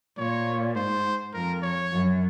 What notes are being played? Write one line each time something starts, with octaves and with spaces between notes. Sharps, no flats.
A#2 C#5
G#2 C5
F2 A#4
C#5
F#2